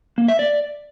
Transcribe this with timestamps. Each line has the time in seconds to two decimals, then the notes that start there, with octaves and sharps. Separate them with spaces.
0.18 A#3
0.28 E5
0.39 D5